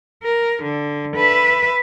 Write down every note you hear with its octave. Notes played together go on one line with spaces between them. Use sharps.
A#4
D3
B4 E5